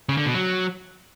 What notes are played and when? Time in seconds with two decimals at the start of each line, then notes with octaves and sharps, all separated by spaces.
0.09 C#3
0.17 D3
0.26 B2
0.34 F#3